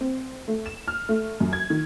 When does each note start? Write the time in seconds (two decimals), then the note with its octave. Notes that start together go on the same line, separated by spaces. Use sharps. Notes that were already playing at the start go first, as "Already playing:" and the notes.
0.01 C4
0.48 A3
0.66 E7
0.88 F6
1.09 A3
1.40 F#2
1.53 G#6
1.70 D#3